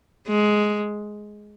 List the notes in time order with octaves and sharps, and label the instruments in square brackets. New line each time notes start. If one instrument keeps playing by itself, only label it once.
[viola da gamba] G#3